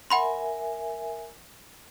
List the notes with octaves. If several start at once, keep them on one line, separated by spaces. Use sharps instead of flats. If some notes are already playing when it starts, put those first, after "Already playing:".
A#4 E5 F#5 G#5 B5 C6